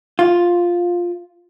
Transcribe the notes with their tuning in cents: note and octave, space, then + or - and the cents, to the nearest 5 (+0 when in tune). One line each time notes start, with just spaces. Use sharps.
F4 +5